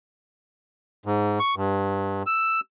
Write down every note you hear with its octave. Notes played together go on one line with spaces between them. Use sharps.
G#2
C#6
G2
E6